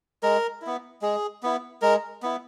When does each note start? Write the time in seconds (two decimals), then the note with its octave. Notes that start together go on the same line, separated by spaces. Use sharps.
0.23 G#3 A#4
0.62 B3 E4
1.02 G#3 G#4
1.43 B3 E4
1.82 G#3 A#4
2.23 B3 E4